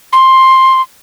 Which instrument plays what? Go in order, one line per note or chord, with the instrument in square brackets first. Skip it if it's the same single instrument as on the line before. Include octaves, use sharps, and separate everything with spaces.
[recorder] C6